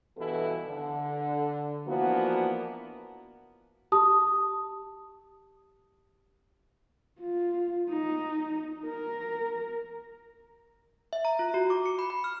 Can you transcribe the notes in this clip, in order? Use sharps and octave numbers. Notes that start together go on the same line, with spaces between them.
G2 B2 E3 E4 A4
D3
E3 F3 A#3 B3 D4 F#4
G4 A5 D#6
F4
D#4
A#4
E5
A#5
F4
F#4
D6
C#7
B5
B5
F6